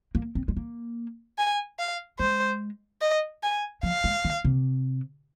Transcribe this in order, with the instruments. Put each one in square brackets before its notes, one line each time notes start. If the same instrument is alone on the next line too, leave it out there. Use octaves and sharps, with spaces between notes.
[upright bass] A#3
C4
G#3
A#3
[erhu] G#5
F5
[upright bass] G#3 [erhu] C5
[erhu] D#5
G#5
[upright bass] F3 [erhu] F5
[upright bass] G#3
D#3
C3